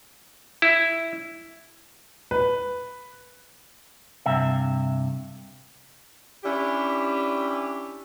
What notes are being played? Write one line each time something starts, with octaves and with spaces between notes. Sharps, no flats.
E4
B4
G2 C3 E5
C#4 D4 E4 G4